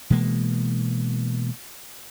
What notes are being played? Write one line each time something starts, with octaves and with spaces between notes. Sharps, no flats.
B2 E3 G#3 A#3